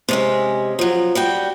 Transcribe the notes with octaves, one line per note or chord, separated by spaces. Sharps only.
C3 G#3 C#4
F3 F#3
G3 F#4 G5